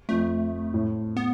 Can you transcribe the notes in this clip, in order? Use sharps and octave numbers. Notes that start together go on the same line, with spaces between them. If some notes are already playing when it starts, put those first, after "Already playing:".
F2 A3
A2
B3